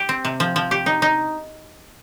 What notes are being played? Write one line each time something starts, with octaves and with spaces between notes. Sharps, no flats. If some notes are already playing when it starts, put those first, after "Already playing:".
Already playing: G4
C4
C3
F3
F3
G4
D#4
D#4